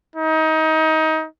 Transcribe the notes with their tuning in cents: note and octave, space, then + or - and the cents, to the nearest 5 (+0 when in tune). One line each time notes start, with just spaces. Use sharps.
D#4 +25